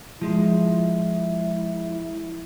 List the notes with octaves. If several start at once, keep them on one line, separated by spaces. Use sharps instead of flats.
F3 G#3 E4